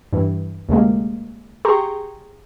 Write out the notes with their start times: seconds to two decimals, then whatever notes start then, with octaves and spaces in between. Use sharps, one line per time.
0.13 G2 E3
0.69 D2 C3 G#3 A#3
1.65 G4 G#4 G5 A#5 C6 C#6